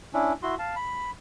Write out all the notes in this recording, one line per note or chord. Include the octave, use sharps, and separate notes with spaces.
C#4 D4 E4
E4 F#4 C6
F5 A5
B5